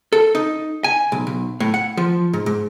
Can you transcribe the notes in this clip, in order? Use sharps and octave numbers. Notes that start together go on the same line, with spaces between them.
A4
D#4
G#5
B1
B1
A2
F#5
F3
G#2
G#2